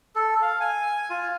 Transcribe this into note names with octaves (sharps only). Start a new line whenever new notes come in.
A4
F5
G#5
F4